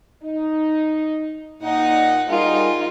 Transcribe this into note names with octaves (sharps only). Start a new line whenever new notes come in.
D#4
A#2 D#4 F#5
G3 D#4 F4 G#4 A#4